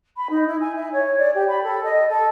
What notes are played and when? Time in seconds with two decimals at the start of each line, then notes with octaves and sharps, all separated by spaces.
0.17 B5
0.30 D#4
0.47 E4
0.60 G#5
0.76 E5
0.92 C#5
1.18 D5
1.34 G4
1.48 B5
1.63 A4
1.83 D#5
2.09 A4